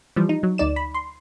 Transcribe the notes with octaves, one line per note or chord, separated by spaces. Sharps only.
E3 F3 G3
D#4
F#3
D2 D#4 D5 E7
B5
C6